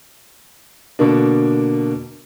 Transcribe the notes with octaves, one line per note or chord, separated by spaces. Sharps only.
B2 D3 A#3 D4